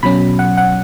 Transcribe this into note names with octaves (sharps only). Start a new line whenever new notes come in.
B2 F#3 C#4 B5
F#5
F#5